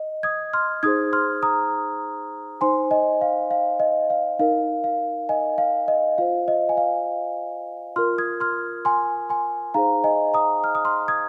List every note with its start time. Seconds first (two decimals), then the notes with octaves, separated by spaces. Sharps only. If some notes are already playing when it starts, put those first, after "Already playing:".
Already playing: D#5
0.23 D#6 G#6
0.53 C6 F6
0.83 D#4 G#4 C5 D#6 G#6
1.13 C6 F6
1.43 A#5 D#6
2.61 D#4 C5 G#5 C6
2.91 D#5 G#5
3.21 F5
3.51 F5
3.80 D#5
4.10 F5
4.39 D#4 A#4 F5
4.84 F5
5.29 D#5 G#5
5.58 F5
5.88 D#5
6.18 F4 C5 F5
6.48 D#5
6.69 G#5
6.77 F5
7.96 F4 A#4 C6 F6
8.18 D#6 G#6
8.40 C6 F6
8.85 G#5 C6
9.30 G#5 C6
9.74 D#4 G#4 C5 F5 A#5
10.04 D#5 G#5
10.34 A#5 D#6
10.64 F6
10.75 D#6
10.85 C6 F6
11.08 D#6 G#6